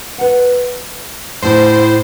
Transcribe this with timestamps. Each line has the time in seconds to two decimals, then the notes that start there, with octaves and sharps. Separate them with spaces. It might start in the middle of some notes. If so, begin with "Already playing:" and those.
0.18 B4 F#5
1.42 A2 E4 C5